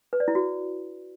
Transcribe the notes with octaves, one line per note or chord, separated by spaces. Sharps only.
B4
D5
E4
F#4